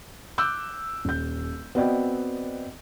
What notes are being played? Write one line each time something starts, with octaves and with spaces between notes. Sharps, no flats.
D6 E6 F#6 G6
D#1 G6
B3 C4 F#4 D5 D#5 G5